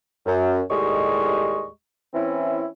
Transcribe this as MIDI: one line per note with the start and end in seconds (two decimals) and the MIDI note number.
0.26 0.62 42
0.70 1.67 39
0.70 1.67 45
0.70 1.67 55
0.70 1.67 56
0.70 1.67 75
0.70 1.67 85
2.14 2.66 52
2.14 2.66 60
2.14 2.66 61
2.14 2.66 64